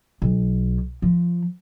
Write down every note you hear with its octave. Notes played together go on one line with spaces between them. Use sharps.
B1
F3